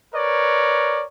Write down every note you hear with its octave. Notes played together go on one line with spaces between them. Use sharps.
A#4 B4 C#5 D5